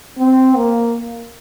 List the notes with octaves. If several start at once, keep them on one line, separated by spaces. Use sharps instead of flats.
C4
A#3